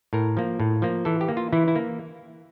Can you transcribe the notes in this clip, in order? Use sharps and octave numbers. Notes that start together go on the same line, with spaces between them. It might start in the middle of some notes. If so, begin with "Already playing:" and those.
A2 A#4
F3 A#3
A2
F3 A#3
E3 A4
G4
A#3
F4
E3 E4
E4
A#3